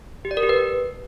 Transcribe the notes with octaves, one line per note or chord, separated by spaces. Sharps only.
G4
D5
A#4
G4
B4